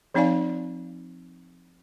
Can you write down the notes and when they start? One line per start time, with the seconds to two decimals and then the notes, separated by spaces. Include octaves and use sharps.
0.14 F3 C4 D#4 D5 F5 G#5